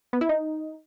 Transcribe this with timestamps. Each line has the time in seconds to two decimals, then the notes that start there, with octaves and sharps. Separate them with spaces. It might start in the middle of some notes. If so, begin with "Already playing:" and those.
0.13 B3
0.21 E4
0.29 D#4